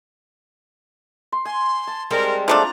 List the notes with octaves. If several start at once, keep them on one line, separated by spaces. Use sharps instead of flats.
C6
G#5 C6
A5
G3 G#3 C4 G4 A#4
F3 A3 C4 D4 F4 D5 A#5